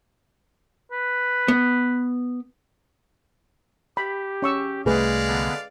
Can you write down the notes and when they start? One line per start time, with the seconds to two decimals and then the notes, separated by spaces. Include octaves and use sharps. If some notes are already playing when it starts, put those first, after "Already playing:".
0.92 B4
1.48 B3
3.97 G4 B5
4.42 C#4 C#6 E6
4.86 C2 G#3 A3 G#4 B4 D5 F5
5.27 D3 B3